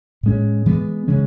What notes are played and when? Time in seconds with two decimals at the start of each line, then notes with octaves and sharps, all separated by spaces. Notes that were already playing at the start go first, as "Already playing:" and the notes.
0.23 A2 G#3 C#4
0.66 E3 G#3 B3
1.08 C#3 G#3 C#4